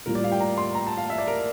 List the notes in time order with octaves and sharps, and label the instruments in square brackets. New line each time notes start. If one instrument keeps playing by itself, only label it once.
[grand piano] A2 G3 A#3 F4 [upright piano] A#4
[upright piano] D5
F5
G5
A#5
C6
A#5
A5
F5
E5
D5
A#4